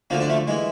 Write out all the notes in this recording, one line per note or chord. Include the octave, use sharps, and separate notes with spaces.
D2 D3 F3 A#3
D4
A3
E3 G#3